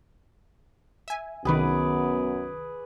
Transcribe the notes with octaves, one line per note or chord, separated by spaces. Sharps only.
E5 G#5
C2 F#2 D#3 B3 G#4 B4 D6